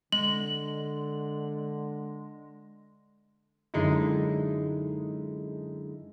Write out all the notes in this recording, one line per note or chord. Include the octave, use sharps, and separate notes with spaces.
D3 G#3 F#7
F#2 D3 G#3 D#4 E4